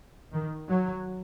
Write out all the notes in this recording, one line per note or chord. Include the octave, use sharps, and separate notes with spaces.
D#3
F#3